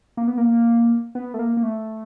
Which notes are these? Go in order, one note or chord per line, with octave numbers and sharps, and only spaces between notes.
A#3
B3
A#3
B3
A3
A#3
A#3
A3